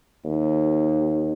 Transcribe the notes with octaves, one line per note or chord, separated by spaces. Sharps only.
D#2